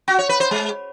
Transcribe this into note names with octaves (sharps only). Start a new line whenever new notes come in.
F#4
C#5
B4
C5
G#3